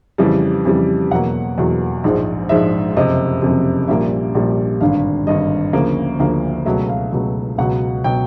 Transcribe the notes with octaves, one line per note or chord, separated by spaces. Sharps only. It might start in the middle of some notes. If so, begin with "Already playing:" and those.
F2 C#3 E3 G3
F2 C#3 E3 G3
E2 B2 F#3 A#3 F#5
E2 B2 F#3 A#3
A#1 G#2 F3 G#3
A#1 G#2 F3 G#3 E5
F#1 F2 C3 D#5
F#1 F2 C3
A#1 A#2 G3 A#3 E5
A#1 A#2 G3 A#3
G#1 G2 D3 F5
G#1 G2 D3 D#5
D2 C#3 F3 A#3
D2 C#3 F3 A#3
C#2 B2 F#3 A3 E5
F5
C#2 B2 F#3 A3
C#2 B2 F#3 F#5
B2 F#3 G5